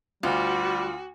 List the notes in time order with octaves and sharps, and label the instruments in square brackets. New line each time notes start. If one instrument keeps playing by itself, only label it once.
[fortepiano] D2 [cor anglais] G3 [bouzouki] F4 [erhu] F#4